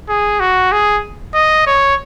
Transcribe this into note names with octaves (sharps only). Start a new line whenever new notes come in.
G#4
F#4
G#4
D#5
C#5